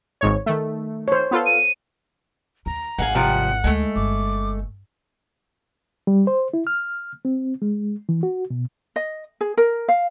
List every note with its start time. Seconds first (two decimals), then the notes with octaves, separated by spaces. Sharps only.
0.21 G#1 G#2 C#5
0.46 D#3 A3
1.08 C5 C#5
1.31 B3 F4 A4
1.46 D#7
2.66 D#2 A#5
2.98 G#1 G#4 F5 F#5
3.15 C3 F3 G3 F#5
3.64 D2 G#3 A3 D#4
3.96 G1 D6
6.07 G3
6.27 C5
6.54 E4
6.67 F6
7.25 C4
7.62 G#3
8.09 E3
8.23 F#4
8.50 B2
8.96 D#5
9.41 G#4
9.57 A#4
9.88 F5